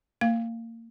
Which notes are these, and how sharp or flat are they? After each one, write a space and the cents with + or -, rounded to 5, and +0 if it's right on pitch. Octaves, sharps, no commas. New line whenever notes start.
A#3 -30 F5 +0